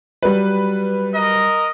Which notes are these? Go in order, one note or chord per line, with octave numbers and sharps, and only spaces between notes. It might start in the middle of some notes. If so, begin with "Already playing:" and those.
F#3 G3 B4
A#4 D#5